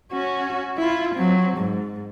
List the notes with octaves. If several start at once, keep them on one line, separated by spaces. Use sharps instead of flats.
C#4 F#4
E4 F4
F#3 C4
G#2